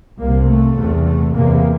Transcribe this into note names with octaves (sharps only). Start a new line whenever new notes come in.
C2 C3 A#3
A3
E2 C3
A3
E2 C3 A#3